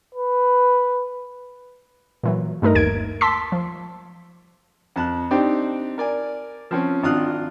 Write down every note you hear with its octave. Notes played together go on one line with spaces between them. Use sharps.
B4
A#2 E3 F#3
G2 A3 D#4 A#4
G1 D#2 G#6 D7
A5 C6 D6 E6 B6
F3
F2 A5 F#6
C4 D4 D#4 G4 C5 D5
A#4 D5 G#5
F3 C4 C#4
G#1 D4 F4 D#6 F6 F#6